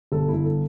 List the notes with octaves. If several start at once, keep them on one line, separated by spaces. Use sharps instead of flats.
G1 A4
E4
G1
A4